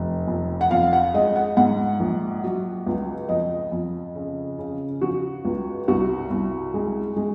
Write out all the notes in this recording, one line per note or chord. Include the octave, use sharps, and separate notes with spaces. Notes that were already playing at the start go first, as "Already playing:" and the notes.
Already playing: F1
F2
F#5
F2 F5
F#5
G#3 D#5
F#5
G#2 F#5
A#1
F#3
C#2
F2 D#5
F2
C#3
C#3
F3 F#4
C#2
C2 F#4
C2
G#3
G#3